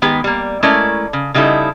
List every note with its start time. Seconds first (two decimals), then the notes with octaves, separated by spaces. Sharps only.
0.02 D#3 G#3 B3 G4
0.24 G3 A#3
0.63 G#3 A3 C#4 E4 A#4 D5
1.13 C#3
1.34 C#3 G3 D#4 E4 A4